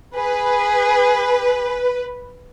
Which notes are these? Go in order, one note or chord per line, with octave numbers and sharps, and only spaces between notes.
G#4 B4